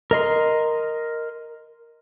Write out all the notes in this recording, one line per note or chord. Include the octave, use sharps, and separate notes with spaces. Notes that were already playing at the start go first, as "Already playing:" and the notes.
A#4 D#5 C6